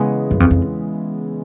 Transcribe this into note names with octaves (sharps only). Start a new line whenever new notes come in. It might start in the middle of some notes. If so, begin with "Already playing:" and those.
Already playing: C#3 E3 G#3 B3
F#2
F2
F2